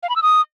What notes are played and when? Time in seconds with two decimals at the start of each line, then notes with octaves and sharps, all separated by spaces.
0.03 F5
0.09 B5
0.16 E6
0.22 D#6